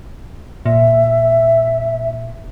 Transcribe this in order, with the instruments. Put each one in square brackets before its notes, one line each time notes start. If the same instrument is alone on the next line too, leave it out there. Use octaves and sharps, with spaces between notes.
[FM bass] A#2 [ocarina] E5